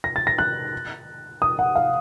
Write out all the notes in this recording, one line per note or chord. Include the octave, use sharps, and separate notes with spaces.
A#6
A6
A#6
F#6
D#6
F#5
F5